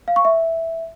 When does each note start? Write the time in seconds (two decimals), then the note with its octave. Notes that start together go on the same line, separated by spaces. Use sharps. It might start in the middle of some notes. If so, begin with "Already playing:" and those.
0.08 F5
0.16 C#6
0.25 E5